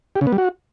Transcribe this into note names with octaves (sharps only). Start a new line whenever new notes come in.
G4
C#3
B3
G3
F#4